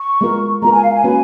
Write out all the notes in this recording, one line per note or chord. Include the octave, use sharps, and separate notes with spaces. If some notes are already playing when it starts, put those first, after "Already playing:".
Already playing: C#6
G#3 B3 F4 A#4
G#3 B3 F4 A#4 A#5
G#5
F5
G#5
A#3 C#4 F#4 B4